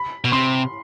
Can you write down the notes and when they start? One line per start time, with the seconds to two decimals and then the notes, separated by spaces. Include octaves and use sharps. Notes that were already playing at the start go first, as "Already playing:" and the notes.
Already playing: B5
0.24 B2
0.32 C3 C6